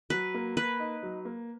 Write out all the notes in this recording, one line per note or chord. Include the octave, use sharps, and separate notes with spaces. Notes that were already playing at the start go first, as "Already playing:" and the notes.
F#3 B4
A#3
A#3 B4
D#4
F#3
A#3